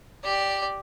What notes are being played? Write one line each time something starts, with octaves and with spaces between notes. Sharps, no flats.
G4 D5